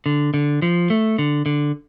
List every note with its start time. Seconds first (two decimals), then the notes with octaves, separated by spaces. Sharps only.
0.06 D3
0.34 D3
0.62 F3
0.90 A3
1.19 D3
1.46 D3